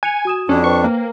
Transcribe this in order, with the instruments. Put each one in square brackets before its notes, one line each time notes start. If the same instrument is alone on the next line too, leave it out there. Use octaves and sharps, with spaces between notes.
[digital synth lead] G#5 [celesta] F#6 C#7 F7
[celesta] F#4 D#6 E7
[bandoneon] F2 D4 [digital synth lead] C#4
[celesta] B4 C5 G5 [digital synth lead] C#6
[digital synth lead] A#3